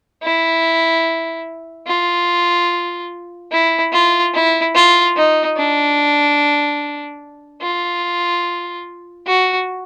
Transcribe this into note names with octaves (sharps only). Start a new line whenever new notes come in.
E4
F4
E4
F4
E4
F4
D#4
D4
F4
F#4